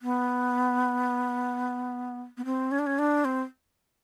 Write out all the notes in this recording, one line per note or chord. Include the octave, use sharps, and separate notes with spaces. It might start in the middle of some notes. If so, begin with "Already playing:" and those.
B3
B3
C4
C#4
D4
C#4
D4
C4